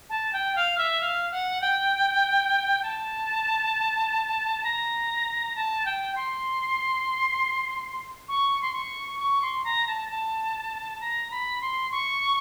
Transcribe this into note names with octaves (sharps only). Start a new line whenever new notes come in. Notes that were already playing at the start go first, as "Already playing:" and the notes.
A5
G5
F5
E5
F5
F#5
G5
A5
A#5
A5
G5
C6
C#6
C6
C#6
C#6
C6
A#5
A5
A5
A#5
B5
C6
C#6